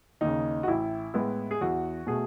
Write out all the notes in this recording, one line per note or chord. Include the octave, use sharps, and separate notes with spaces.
D#2 C#3 D#4
F#4
A1 E4
A2 G#3 B3 E4
G#4
E2 F#4
B2 A3 G#4